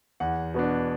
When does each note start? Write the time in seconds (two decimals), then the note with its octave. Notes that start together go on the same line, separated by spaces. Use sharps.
0.20 E2 F#5
0.54 B2 B3 D4